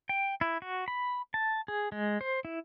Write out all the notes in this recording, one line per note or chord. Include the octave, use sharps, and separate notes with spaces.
G5
E4
F#4
B5
A5
G#4
G#3
C5
E4